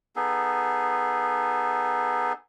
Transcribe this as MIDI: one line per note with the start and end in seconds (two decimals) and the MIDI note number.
0.16 2.33 59
0.16 2.33 63
0.16 2.33 68
0.16 2.33 69